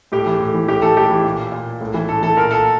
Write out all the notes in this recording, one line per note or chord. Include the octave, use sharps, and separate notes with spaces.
A2 G4
E3
A2
E3
A2 G4
E3 A4
A2 G4
E3
A#2
A#2
A2
E3
A2 A4
E3 A4
A#2 A#4
A4